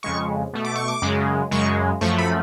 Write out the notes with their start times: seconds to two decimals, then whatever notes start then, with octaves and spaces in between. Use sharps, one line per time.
0.03 F2 C#3 G#3 C#6
0.53 B2 A3
0.64 D6
0.76 C#6
0.88 D6
1.02 F#2 C#3 G#3
1.51 F#2 C#3 G#3 C#6
2.01 F#2 F3 A3 C#6
2.18 B5